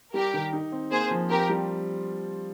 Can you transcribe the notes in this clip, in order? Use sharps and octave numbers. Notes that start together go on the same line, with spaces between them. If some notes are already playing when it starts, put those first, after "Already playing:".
G3 G4 A#4
D#3
D#4
C4
A#3 G#4 C5
F3
C4 G4 A#4
G3